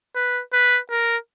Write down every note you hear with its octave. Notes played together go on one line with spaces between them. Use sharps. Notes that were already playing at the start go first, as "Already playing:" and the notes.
B4
B4
A#4